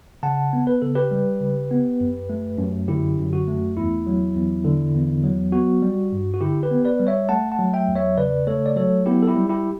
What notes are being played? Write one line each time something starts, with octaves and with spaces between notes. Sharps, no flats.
C#3 F#5 A5
B3
B4
C#3 A4
G4 B4
G3
C#3
B3
F#2
A3
F#2
D3 E4 G4
F#2
F#4
A3
E2 E4
F#3
E2
D3
E2
F#3
B3 F#4
G3
G2
F#4
D3 E4 G4
G4 B4
B3
B4 D5
G3
C#5 E5
A3 F#5 A5
F#5 A5
F#3
E5 G5
E2
C#5 E5
C#3 B4 D5
A3 A4 C#5
D5
F#3 A4 C#5
B3 E4 G4
A4
E4 G4
G3
E4 G4